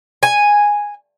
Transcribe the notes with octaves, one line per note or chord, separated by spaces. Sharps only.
G#5